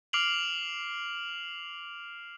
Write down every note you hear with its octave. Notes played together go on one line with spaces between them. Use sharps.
D6 F6 C7 D7 F7 F#7